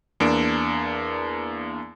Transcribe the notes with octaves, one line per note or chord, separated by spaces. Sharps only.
E2 A#3 D4 D7